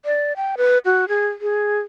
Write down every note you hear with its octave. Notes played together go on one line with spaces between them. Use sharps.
D5
G5
B4
F#4
G#4
G#4